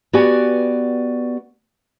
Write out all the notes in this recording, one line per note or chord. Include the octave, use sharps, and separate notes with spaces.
B3 F#4 G4 D5 G#5